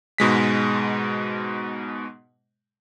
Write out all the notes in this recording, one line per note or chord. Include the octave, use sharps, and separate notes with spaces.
G#2 B2 G#3 B6